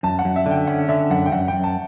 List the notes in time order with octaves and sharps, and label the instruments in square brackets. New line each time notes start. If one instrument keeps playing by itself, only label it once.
[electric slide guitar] F#2 [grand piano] A5
[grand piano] F#5
[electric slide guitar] F#2
[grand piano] E5
[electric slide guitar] D3 [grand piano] G5
[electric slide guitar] C#4 [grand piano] F#5
[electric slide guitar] D3 [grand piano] E5
[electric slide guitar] F#2 [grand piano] F#5
[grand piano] G5
[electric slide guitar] F#2 [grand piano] F#5
[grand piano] G5
[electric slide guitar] F#2
[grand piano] A5